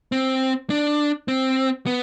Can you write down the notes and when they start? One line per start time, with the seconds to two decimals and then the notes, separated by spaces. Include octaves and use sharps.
0.12 C4
0.70 D4
1.28 C4
1.86 B3